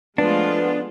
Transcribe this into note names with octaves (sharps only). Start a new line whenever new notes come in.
F3 G#3 A3 B3 D4 F4